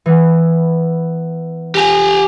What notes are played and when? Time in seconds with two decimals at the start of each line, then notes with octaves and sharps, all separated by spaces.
0.06 E3 B3
1.75 G4 G#5 A#6